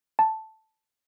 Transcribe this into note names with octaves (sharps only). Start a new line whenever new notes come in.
A5